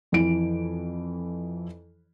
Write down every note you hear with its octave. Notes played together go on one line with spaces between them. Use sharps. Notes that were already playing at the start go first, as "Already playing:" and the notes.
F2 E3 D7